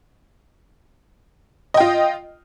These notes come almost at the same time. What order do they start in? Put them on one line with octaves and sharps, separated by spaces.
D#5 G5 F4